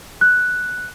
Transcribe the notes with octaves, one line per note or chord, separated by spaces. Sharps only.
F#6